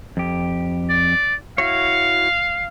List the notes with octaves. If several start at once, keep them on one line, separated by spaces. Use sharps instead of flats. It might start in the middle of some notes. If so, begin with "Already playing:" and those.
F2 G4
D5
E4 F#4 C#5 F5